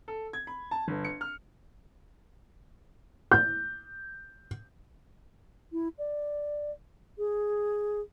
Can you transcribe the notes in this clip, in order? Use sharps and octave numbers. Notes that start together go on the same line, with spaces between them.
A4
G#6
B5
A5
G1
C#7
F6
G6
E4
D5
G#4